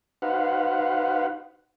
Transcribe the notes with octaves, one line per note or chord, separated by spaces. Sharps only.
D#4 F#4 B4 C5 F5 F#5